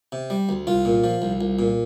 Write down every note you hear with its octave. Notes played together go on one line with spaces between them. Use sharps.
C3
G3
D2
C2 F4
A#2
F3
C2
C2
A#2